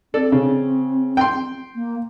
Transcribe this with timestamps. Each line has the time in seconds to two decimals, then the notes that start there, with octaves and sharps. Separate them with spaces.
0.14 C4 A4 D5
0.32 C#3
1.17 G5 C6
1.75 A#3